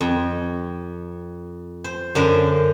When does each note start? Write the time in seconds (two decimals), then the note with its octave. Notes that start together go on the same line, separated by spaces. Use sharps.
0.01 F2
1.84 C5
2.15 F#2 D3 A#4 C5